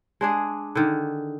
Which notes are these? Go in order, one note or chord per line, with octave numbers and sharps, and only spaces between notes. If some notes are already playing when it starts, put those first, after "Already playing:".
G#3 D4 G#4
D3 D#3